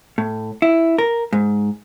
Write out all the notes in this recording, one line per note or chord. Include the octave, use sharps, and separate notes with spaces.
A2
E4
A#4
G#2